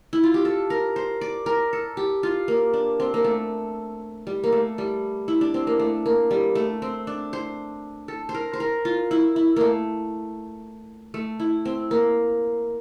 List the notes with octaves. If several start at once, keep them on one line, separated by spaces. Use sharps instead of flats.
E4
F4
G4
A4
A#4
C5
D5
A#4
A4
G4
F4
A#3
D4
C4
A#3
A3
G3
A#3
A3
G3
E4
D4
C4
A#3
A3
A#3
G3
A3
C4
D4
C5
A4
C5
A#4
C5
A#4
F4
E4
E4
A3 A#3
A3
E4
C4
A#3